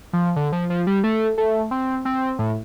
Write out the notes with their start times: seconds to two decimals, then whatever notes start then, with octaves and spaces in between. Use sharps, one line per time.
0.13 F3
0.36 D3
0.52 F3
0.70 F3
0.87 G3
1.04 A3
1.38 A3
1.71 C4
2.05 C4
2.39 A2